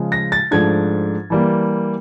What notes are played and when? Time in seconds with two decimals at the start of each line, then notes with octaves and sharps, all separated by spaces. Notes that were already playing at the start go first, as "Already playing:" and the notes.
Already playing: C#3 F3 G#3
0.12 A#6
0.32 A6
0.51 G#2 F3 A3 D4 G#6
1.30 E3 G3 A#3